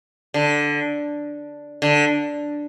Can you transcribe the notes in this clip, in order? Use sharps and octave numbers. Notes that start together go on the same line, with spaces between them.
D3
D3